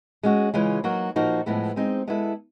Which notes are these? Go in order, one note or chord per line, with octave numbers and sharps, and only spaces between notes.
G#3 C#4 F#4
C#3 E3 G#3 C#4 F4
F#3 A#3 D#4 F#4
A#2 F3 A#3 D#4 F#4
A2 F3 G#3 B3 E4
G#3 C4 D#4 G#4
G#3 B3 E4 A4